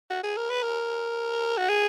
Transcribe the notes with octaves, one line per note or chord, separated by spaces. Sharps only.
F#4
G#4
A#4
B4
A#4
F#4
G#4